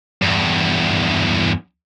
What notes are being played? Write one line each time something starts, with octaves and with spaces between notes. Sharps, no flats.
E2 G2